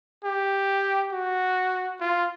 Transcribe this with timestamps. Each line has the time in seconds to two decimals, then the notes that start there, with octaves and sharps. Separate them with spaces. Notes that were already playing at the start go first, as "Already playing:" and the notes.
0.24 G4
1.12 F#4
2.01 F4